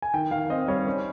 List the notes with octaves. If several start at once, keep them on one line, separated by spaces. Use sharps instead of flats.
G#5
D#3 G5
D#3 F5
C4 D#5
G3 C#5
C#4